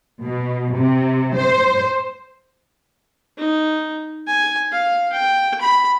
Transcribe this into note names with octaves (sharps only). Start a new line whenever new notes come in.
B2
C3
C5
D#4
G#5
F5
G5
B5